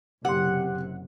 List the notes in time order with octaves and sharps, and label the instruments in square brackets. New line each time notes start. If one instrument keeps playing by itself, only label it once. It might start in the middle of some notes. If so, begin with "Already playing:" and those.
[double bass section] F#1 C3 [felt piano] G4 C6 [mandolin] F#5